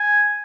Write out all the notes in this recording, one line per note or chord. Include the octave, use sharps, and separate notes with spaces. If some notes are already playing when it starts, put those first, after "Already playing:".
Already playing: G#5